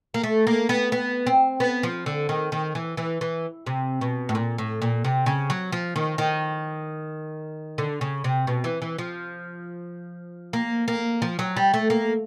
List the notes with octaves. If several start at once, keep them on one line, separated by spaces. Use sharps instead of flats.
A#3
A3
A#3
B3
B3
C4
B3
F3
D3
D#3
D#3
E3
E3
E3
C3
B2
A2
A#2
A2
A#2
C3
C#3
F#3
F3
D#3
D#3
D3
C#3
C3
B2
E3
E3
F3
A#3
A#3
F3
F#3
G3
A3
A#3